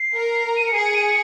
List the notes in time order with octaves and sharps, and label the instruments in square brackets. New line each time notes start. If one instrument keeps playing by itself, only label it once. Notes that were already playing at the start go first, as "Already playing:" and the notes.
Already playing: [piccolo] C7
[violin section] A#4
[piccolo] D#7
C#7
[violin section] G#4 [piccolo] C7
[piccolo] C#7
D#7
C#7